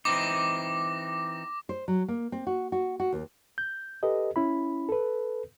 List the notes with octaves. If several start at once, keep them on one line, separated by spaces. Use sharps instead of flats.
E3 C4 D#4 D6 A#6
C5
F#3
A#3
C4
F#4
F#4
F#4
D#2
G6
G4 A4 B4 D#5
C#4 E4 B5
A4 B4